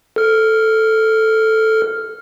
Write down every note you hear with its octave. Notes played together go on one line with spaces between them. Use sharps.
A4 F6